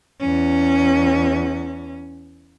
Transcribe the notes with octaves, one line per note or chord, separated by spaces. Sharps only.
E2 C#4